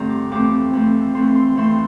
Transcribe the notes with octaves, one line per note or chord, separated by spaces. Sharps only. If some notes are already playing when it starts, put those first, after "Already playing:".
Already playing: G2 D3 A3 C4 A#5
D6
F2 E3 A3 C4 D6
F2 E3 A3 C4
F2 E3 A3 C4 C6
C6
F2 E3 A3 C4 C6